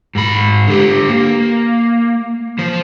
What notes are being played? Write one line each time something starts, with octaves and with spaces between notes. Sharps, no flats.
G#2 B5
D3 G4
A#3
F3 C5